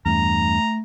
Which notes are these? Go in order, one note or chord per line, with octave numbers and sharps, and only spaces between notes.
E2 G2 A3 A#5